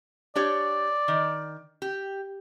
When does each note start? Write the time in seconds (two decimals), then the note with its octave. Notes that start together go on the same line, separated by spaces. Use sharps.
0.35 D4 G4 C#5 D5
1.08 D#3
1.82 G4